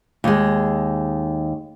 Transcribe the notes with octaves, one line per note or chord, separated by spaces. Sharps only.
D#2 G#3